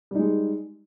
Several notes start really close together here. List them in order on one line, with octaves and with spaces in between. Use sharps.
G3 D#4 G#3